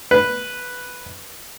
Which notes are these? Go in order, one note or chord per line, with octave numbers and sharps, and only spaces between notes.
B4